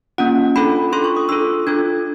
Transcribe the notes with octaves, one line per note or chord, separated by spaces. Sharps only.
A#3 C#4 F4 F#5
D4 F4 A4 B5
D4 F4 A4 C6
C#6
D#6
D4 F4 A4 E6
D4 F4 A4 G#6